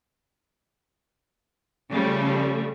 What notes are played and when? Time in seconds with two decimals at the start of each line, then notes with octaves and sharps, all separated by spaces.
1.92 C#3 F3 G3 A3